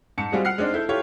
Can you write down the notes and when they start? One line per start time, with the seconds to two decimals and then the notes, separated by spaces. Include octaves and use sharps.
0.18 G#2 A5 C#7
0.32 G3 G#3 C4 F4 F#4 G#4
0.45 F#5 F6 F#6 C7
0.58 G#3 C4 D4 D#4
0.74 E4 A4 G6
0.89 E4 F4 G4 A4 C#5